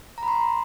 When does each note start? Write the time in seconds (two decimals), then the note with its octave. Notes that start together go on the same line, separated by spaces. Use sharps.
0.18 A#5
0.23 B5
0.28 C6